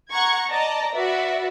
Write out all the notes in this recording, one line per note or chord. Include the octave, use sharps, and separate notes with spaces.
F#5 A#5 C#6 G#6
D5 D#5 A5 A#5
F#4 B4 D5 E5